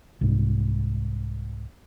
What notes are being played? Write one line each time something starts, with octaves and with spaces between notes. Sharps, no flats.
C2 G#2